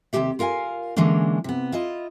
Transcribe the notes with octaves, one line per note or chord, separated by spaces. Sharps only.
D#2 C3 F#3 G#3 G4 E5
F4 A#4 F5 F#5 G#5
D3 E3 G#3 A#3 C#4 D4
C3 B3
E4 F4 D#5